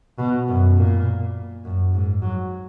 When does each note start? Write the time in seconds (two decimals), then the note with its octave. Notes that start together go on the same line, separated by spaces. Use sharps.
0.18 B2
0.48 F#2
0.77 A#2
1.65 F#2
1.94 G#2
2.22 F#3